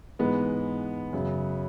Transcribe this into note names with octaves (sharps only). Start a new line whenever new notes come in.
G#2 E3 G#3 B3
F#2 C#3 F#3